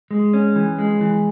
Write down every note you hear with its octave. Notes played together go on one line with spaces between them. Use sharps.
G#3
C#4
E3
G#3
E3